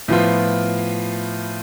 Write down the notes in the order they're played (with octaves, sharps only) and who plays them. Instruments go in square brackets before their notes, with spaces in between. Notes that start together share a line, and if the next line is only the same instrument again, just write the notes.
[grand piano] A2 F3 B3 F4